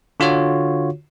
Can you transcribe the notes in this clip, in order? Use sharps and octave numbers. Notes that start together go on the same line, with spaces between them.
D3 F4 F#4 C#5